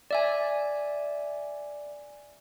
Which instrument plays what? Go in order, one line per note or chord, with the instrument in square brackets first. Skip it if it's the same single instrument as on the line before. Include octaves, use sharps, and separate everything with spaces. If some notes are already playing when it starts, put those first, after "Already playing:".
[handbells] D5 E5 G#5